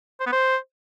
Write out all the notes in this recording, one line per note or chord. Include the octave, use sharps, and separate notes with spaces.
C5
B3
C5